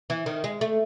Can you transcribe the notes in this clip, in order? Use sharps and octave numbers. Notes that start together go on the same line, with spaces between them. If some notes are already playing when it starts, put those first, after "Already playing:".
E3
D#3
G#3
A3